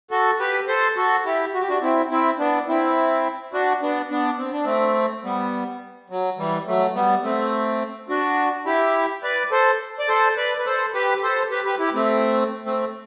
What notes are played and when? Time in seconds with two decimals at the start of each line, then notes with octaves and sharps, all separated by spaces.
0.11 F#4 A4
0.39 G4 B4
0.68 A4 C5
0.96 F#4 A4
1.25 E4 G4
1.54 F#4
1.61 G4
1.69 D4 F#4
1.82 C4 E4
2.10 C4 E4
2.39 B3 D4
2.68 C4 E4
3.53 D4 F#4
3.82 B3 D4
4.10 B3 D4
4.38 C4
4.52 D4
4.64 A3 C4
5.24 G3 B3
6.10 F#3
6.38 E3 G3
6.67 F#3 A3
6.95 G3 B3
7.23 A3 C4
8.09 D4 F#4
8.66 E4 G4
9.23 B4 D5
9.51 A4 C5
9.99 D5
10.08 A4 C5
10.37 B4 D5
10.58 B4
10.66 A4 C5
10.94 G4 B4
11.23 A4 C5
11.51 G4 B4
11.65 G4 B4
11.79 E4 G4
11.94 A3 C4
12.65 A3 C4